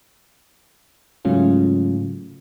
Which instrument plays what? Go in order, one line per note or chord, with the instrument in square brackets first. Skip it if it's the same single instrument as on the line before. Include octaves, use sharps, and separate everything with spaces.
[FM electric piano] G#2 C#3 F#3 A3 C#4 F4